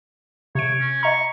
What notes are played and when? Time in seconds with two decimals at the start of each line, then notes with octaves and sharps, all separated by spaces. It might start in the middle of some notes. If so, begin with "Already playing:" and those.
0.55 C3 C#5 D7
0.80 C#4
1.03 D#5 A#5 C#6